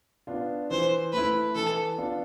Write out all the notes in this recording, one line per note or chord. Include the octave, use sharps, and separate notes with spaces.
B3 D4 F4
E3 C5
A3 E4 B4
E3 A4
B3 D4 F4